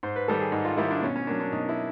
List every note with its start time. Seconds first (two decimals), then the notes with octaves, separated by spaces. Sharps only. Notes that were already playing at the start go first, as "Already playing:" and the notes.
0.03 G#2 C5
0.16 B4
0.28 D#3 G3 A4
0.40 G#4
0.52 G#2 D#4
0.65 F4
0.77 D#3 G3 E4
0.91 D4
1.02 B2 C#4
1.16 C#4
1.27 F#3 A#3 D4
1.40 D4
1.52 B2 D#4
1.69 E4